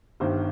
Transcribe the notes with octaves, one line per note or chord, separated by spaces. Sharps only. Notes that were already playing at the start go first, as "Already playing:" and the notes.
G1 G2 D#3 C5